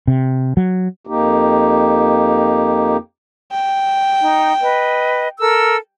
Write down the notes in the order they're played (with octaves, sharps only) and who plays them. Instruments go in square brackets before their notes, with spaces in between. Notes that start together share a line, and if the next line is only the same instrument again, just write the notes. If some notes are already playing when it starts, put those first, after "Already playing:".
[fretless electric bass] C3
F#3
[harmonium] F2 A#3 D#4 G4
[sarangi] G5
[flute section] D#4
B4 D#5
A4 A#4 E6